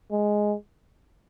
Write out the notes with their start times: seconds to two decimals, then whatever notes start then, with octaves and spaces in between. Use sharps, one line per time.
0.11 G#3